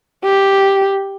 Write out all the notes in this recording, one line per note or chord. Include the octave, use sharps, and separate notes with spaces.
G4